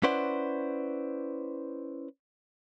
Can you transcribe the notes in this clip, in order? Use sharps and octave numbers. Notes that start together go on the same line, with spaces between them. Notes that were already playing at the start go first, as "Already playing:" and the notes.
C#4 E4 B4 C5 D5 F#5